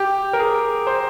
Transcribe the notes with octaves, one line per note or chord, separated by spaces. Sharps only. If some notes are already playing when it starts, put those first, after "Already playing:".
Already playing: G4
A#4
G#4
C5